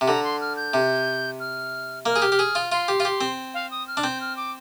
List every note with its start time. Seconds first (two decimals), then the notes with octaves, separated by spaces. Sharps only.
0.01 C3
0.07 D3 A#5
0.24 C6
0.41 F6
0.56 G6
0.74 C3
1.40 F6
2.05 A#3 F6
2.16 G#4
2.22 G4
2.32 G4
2.39 G#4
2.55 F4
2.72 F4 C6
2.88 G4
3.00 F4
3.05 G4
3.21 C4
3.54 F5
3.71 D#6
3.88 F6
3.97 D4
4.04 C4 G6
4.21 F6
4.37 D6